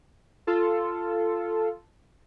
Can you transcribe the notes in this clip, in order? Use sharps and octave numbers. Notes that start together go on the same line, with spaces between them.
F4 A4